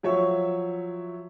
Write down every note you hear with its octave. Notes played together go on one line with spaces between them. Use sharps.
F3 F#3 C#5 E5 C#6